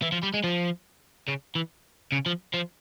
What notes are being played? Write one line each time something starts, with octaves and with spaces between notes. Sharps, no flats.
E3
F3
G3
G#3
F3
C#3
E3
C#3
F3
F3